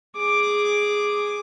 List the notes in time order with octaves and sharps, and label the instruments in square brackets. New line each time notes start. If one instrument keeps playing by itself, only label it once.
[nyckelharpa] G#4 D6